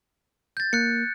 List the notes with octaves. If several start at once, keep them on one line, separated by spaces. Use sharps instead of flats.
G6 A6
A#3 F#6 C#7